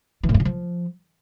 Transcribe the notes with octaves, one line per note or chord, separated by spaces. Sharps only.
E3
A2
G2
D3
F3